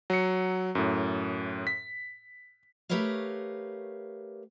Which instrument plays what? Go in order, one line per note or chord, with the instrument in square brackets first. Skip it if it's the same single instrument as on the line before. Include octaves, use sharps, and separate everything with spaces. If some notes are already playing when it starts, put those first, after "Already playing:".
[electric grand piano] F#3 C#7
F#2 A2
B6
[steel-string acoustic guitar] A3 G4 A#4 B4 C#5 F5